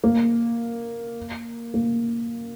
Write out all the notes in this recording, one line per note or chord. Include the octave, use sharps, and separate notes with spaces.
A#3
A#3